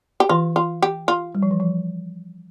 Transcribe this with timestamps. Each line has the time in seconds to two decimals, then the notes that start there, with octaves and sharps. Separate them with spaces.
0.20 G4
0.29 E3 F4
0.56 F4
0.82 G4
1.08 F4
1.35 G3
1.43 F3
1.51 E3
1.60 F3